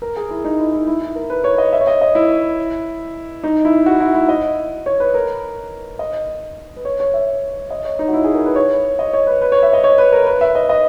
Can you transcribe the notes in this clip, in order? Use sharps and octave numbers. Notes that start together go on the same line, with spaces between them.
A#4
G#4
E4
D#4
E4
E4
E4
E4
A#4
B4
C#5
D#5
E5
C#5
D#5
D#5
E4
D#4
E4
F#4
E4
E4
D#5
C#5
B4
A#4
D#5
B4
C#5
C#5
E5
D#5
C#5
D#4
F#4
E4
G#4
A#4
B4
C#5
D#5
C#5
B4
B4
C#5
E5
D#5
C#5
B4
A#4
B4
E5
D#5
D#5